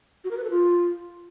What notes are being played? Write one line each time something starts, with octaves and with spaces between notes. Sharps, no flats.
F#4
A#4
B4
A4
F4